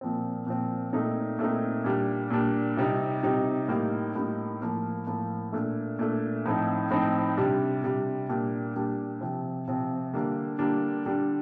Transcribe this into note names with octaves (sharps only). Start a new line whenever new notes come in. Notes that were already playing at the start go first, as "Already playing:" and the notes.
A#2 F3 C4
A#2 F3 C4
A#2 A3 C4 D#4
A#2 A3 C4 D#4
A#2 G3 D4
A#2 G3 D4
C3 G3 C4 D#4
C3 G3 C4 D#4
A2 G3 A#3 D#4
A2 G3 A#3 D#4
A2 F3 A#3
A2 F3 A#3
A#2 A3 D4
A#2 A3 D4
A2 F3 C4 D#4
A2 F3 C4 D#4
C3 G3 D4
C3 G3 D4
A#2 G3 D4
A#2 G3 D4
C3 F3 C4
C3 F3 C4
D3 G3 A#3 D4
D3 G3 A#3 D4
D3 G3 D4